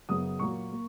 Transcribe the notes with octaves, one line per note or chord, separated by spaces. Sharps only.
F#2 C#3 F#3 B3 D#6
A#2 F#3 A#3 C#6
A#3